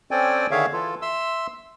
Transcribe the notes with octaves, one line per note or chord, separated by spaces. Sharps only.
C4 C#4 A4 D5 G5 G#5
D3 D#3 G#4 C#5 E5 F5
E3 F4 A4
E5 C6 E6